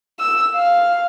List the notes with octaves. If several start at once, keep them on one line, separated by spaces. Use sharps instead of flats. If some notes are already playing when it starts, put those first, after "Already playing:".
E6
F5